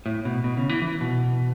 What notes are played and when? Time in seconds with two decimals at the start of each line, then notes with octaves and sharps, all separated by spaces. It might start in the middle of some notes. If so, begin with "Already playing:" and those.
0.06 A2
0.25 B2
0.44 B2
0.57 C#3
0.69 E3
0.82 E3
1.01 B2